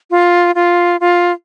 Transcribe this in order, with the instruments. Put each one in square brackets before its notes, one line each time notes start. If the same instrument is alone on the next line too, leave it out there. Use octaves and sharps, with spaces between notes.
[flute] F4
F4
F4